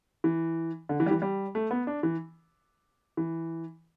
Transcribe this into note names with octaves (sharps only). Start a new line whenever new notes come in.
E3
D3
E3
G3
E3
G3
A3
B3
D4
E3
E3